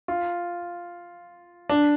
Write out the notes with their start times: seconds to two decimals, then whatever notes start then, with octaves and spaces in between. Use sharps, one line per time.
0.08 F4
1.70 D4